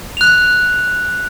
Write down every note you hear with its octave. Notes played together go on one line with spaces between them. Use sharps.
F#6 F7